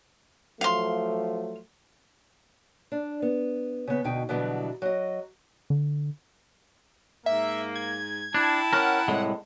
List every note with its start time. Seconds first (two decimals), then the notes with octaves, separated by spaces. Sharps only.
0.61 F3 F#3 A3 F5 C6
2.92 D4
3.22 B3
3.87 C#3 B3
4.04 D2 B2 D#4 G5
4.29 B2 D3 E3 F#3 G3 B3
4.82 F#3 D#5
5.70 D3
7.26 G#2 A#3 E5
7.75 G#6
8.34 D4 E4 G5 A5
8.73 C#4 A#4 F#5
9.08 C2 A2 G#3